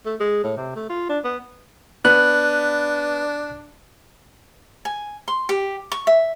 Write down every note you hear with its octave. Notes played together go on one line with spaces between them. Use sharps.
A3
G#3
A2
C3
A3
F4
D4
B3
B3 D4 F#6
G#5
C6
G4
C#6
E5